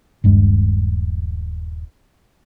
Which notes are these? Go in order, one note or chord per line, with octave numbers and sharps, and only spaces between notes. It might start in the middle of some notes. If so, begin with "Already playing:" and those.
D#1 G2 G#3